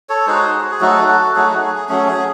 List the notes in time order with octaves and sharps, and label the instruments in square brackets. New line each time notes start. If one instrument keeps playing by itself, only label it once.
[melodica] A4 C#5
G#3 D#4 F#4 G#4 C5
F#4
G#4
F#3 A3 D#4 F#4 A4
F#4 A4
F#3 A3 D#4 F#4 G#4
F#4
G#4
G#4
F#3 A3 C#4 G#4
G#4